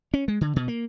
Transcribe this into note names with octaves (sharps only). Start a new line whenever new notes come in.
C#4
G#3
D3
B2
A#3